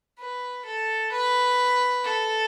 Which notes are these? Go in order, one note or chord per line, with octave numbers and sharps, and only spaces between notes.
B4
A4
B4
A4